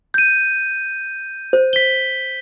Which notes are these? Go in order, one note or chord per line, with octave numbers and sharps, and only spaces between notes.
G6 D#7
C5
B6 G7